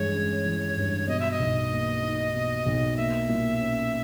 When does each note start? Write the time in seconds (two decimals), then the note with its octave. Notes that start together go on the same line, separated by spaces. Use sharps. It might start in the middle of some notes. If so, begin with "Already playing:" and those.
Already playing: G2 E3 G#3 C#5
0.14 C#4
0.45 E3
0.77 G2
1.08 B2 D#5
1.20 E5
1.31 D#5
1.40 B1
1.71 A#3
2.03 D#4
2.34 B2
2.66 B1
2.97 A#3 E5
3.29 A#2
3.61 C#4